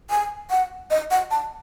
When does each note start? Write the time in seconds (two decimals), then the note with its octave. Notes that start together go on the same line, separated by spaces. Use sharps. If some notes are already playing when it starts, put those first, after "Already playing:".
0.10 G#5
0.50 F#5
0.91 D#5
1.11 F#5
1.31 A5